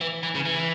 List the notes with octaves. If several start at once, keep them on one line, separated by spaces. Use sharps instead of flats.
E3
E3
C#3
E3